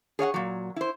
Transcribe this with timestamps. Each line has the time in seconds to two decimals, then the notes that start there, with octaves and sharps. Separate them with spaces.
0.19 G#4 C#5 F5 F#5
0.34 A#2 F#3
0.76 E4 C5